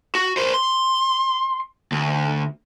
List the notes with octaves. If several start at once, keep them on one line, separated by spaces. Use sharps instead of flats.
F#4
A#4 C5
C6
D2